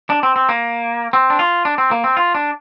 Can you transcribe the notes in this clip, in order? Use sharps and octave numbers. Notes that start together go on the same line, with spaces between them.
D4
C4
C4
A#3
C4
D4
F4
D4
C4
A#3
C4
F4
D4